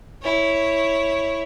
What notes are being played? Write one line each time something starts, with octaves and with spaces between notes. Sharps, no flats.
E4 C#5